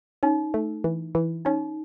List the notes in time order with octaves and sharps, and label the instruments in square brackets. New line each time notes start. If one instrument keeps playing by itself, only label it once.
[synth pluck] C#4 [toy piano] D#4
[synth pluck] A3
E3
E3
[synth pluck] C#4 [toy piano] D#4